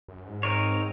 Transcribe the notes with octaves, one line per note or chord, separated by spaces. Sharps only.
F#2
G#2
C4 D#4 A#4 C#5